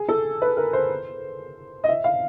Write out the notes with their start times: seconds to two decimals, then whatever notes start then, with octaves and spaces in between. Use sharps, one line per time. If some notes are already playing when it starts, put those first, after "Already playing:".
Already playing: G#4
0.09 A4
0.42 B4
0.57 A#4
0.73 C5
1.84 D#5
1.89 E5
2.04 F5